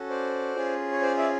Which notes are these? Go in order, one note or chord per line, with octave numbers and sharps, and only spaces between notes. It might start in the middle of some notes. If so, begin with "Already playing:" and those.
Already playing: C#4 F#4 A4
C5 D5
C#4 F4 G#4
C#5
C5 D5
D5 E5